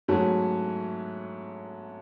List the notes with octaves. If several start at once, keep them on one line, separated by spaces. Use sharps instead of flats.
G#2 F#3 A3 C#4 F#4